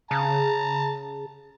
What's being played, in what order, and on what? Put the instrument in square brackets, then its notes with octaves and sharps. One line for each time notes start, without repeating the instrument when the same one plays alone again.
[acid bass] C#3 [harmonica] A5 A#5